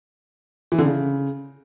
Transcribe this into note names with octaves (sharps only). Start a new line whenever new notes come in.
E3
D3
C#3